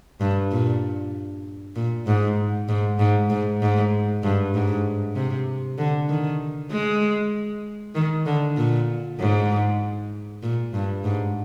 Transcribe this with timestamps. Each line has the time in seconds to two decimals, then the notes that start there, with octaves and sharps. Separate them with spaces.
0.20 G2
0.51 A#2
1.76 A#2
2.07 G#2
2.68 G#2
2.99 G#2
3.30 G#2
3.62 G#2
4.23 G2
4.54 G#2
5.15 C3
5.78 D3
6.09 D#3
6.71 G#3
7.95 D#3
8.26 D3
8.57 A#2
9.19 G#2
10.42 A#2
10.74 G2
11.04 G#2